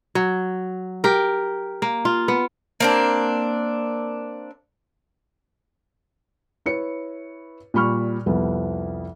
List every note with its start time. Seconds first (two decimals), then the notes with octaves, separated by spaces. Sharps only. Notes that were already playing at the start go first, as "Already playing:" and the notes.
0.15 F#3
1.04 G4 A#4
1.82 A#3
2.05 F4
2.28 B3
2.80 A#3 C4 D4
6.66 E4 B4 C#5 C#7
7.74 A#2 G3 B5 C#6 F6
8.26 C2 F2 B3